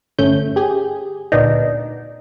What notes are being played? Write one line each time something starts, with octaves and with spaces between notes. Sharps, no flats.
G1 A3 C#4 G6
G4 G#4
D2 A#2 B3 D4 D#4